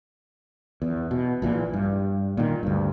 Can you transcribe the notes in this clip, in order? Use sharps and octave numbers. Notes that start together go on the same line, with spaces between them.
E2
B2
A#1 A#2 E3
G2
A#2 D#3
D2 G2